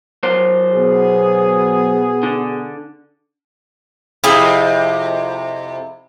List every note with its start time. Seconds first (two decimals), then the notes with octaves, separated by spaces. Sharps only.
0.23 F#3 A#4 C5
0.74 B2 B3 G#4
2.23 D3
4.24 F2 C3 E4 G#4 F5